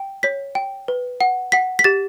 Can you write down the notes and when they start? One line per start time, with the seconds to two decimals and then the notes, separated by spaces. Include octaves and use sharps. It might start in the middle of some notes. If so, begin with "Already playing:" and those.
Already playing: G5
0.23 C#5 B6
0.55 G5
0.88 B4
1.21 F#5
1.52 F#5 B6
1.79 B6
1.84 G4 A6